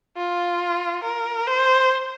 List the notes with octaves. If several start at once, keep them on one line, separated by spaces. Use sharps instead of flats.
F4
A#4
C5